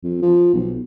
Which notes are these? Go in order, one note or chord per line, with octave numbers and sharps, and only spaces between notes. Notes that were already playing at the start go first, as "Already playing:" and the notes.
F2
F3
B1